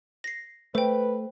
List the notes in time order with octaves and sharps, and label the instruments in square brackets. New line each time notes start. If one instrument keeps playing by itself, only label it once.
[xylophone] A#6 C7
[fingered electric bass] A3 [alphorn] B4 [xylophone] C5 G5